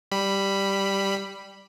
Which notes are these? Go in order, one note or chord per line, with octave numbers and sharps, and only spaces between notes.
G3 B5